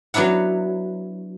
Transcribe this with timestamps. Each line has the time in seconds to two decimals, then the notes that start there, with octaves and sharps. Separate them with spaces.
0.14 F#3 B3 D4 E4 F#5